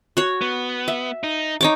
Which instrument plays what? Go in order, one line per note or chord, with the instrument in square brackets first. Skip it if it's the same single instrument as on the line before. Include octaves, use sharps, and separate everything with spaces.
[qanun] F#4 C#5
[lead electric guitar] B3
[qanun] E5
[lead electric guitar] D#4
[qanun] D#4 C#5 D6